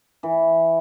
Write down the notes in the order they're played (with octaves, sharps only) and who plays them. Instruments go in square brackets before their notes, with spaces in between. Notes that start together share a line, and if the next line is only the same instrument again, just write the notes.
[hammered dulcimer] E3